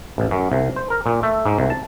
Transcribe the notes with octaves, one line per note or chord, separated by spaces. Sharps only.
A1
F#2
C2
C5
A#4
A#2
A3
G#2
C2
A5